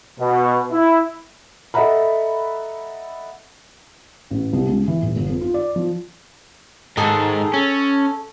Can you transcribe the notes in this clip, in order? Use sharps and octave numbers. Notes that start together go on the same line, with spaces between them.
B2
E4
A4 D#5 E5 F#5 A#5 B5
A1
C2
C#2
E3
D#1
G1
F2
F4
D5
F3
G#2 D#3 G#4 A4
C#4 A4